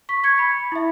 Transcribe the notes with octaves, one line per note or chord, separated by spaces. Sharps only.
C#6 B6
C#6 G#6 C#7
B5 C#7
E4 E5